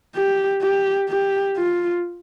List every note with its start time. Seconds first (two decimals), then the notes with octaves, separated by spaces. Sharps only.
0.15 G4
0.62 G4
1.09 G4
1.56 F4